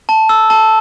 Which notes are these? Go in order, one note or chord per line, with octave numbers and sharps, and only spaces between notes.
A5
E6
A5